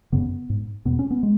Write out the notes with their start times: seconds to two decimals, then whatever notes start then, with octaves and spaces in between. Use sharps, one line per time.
0.12 F#2 C#3 B3
0.50 G#2
0.85 E2 B2 B3
0.99 C#4
1.11 B3
1.23 G#3